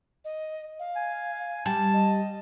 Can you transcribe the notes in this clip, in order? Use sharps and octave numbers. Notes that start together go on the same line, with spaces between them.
D#5
F5
G#5
G3 A5
D#5